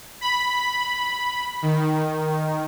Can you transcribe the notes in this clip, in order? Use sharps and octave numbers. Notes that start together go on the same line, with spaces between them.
B5
D#3